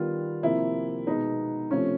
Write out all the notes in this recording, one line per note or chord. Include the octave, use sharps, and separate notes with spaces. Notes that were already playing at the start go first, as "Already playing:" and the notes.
Already playing: D#3 G3 B3 F4
C3 F3 A#3 E4
B2 G#3 B3 D#4
C3 F3 A3 C#4